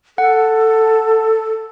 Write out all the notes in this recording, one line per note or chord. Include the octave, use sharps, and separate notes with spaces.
A4 F#5